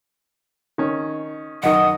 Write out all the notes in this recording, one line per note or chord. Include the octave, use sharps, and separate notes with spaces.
D#3 C#4
F#2 D#3 D#5 F#5